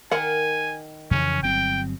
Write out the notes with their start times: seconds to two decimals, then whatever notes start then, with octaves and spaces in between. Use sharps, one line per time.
0.11 D#3 A#4 F#5 G#5
1.11 F2 C#3 E3 C#4
1.43 G1 F#3 C4 G5